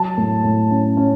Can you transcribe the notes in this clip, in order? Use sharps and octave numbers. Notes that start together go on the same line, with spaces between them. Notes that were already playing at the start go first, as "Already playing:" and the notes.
Already playing: F#3 A5
A2
A2
C#4
C#4